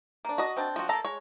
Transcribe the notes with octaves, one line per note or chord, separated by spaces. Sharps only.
A#3 D4
F#4 D#5
C4 D4 A5
F3 F#4
A#3 A4 A5 A#5
G#3 C#5